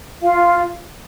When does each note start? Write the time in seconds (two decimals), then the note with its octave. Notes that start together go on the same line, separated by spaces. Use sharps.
0.22 F4 F5